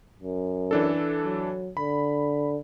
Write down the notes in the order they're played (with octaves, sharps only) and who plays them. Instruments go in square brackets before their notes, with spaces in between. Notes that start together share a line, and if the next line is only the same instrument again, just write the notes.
[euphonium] F#2
[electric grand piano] E3 D4 A4
[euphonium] F#3
[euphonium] D3 [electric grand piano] B5